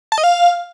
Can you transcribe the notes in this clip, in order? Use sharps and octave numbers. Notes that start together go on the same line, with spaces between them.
A5
D#5
F5